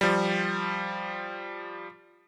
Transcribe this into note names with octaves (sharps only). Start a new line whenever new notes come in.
F3 G3